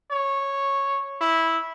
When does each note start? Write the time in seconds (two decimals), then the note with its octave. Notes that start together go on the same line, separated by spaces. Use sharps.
0.11 C#5
1.21 E4